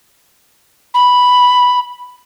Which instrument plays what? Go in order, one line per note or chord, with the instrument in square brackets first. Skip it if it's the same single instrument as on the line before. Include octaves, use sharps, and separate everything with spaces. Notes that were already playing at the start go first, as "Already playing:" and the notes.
[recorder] B5